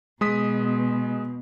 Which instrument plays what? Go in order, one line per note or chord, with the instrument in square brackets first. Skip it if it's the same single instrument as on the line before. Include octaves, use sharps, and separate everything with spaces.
[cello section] B2 [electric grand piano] G#3 D#6 B6